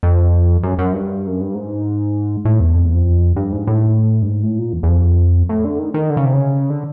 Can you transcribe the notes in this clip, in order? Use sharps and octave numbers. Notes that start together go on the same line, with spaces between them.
F2
F#2
F#2
G2
F#2
G2
G#2
A2
E2
F2
E2
F2
G2
G#2
A2
G2
G#2
A2
A#2
E2
E2
F2
A2
D3
D#3
D#3
D3
C#3
C3
C#3
D3